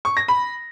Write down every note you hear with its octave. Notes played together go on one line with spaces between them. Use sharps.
C#6
A#6
B5